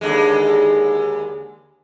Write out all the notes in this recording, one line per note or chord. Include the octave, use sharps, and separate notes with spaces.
D#2 D3 G#3